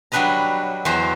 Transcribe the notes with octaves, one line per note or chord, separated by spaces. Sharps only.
F#3 G3 D4 B4 D#5 A#5
E2 E3 F#3 F#4 C5 A#5